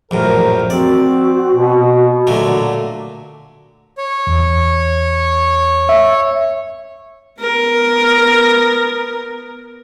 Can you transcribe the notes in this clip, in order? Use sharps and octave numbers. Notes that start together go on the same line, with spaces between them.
A#1 F#2 A2 A#4 C5
C4 F#4 D5
B2
A#2 D3 F#3 A3
C#5
E2
E5
B3 A#4